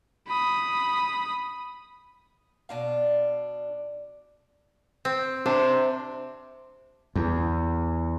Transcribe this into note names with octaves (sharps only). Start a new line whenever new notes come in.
B5 D#6
B2 D4 F5
C4
C3 D4 C5
E2